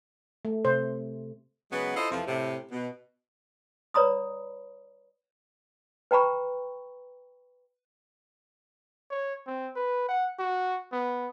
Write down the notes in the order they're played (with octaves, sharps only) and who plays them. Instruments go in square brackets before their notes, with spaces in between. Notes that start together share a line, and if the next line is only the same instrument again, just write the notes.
[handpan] A3
[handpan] C3 [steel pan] C5
[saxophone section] C#3 F#3 G#3 B3
E4 F4 A4 C5 D#5
F2 C3 E3 F3
A2 C3
B2
[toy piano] B4 C#5 D5 A#5 B5 D#6
B4 G5 A#5 B5 C#6
[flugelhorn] C#5
C4
B4
F#5
F#4
B3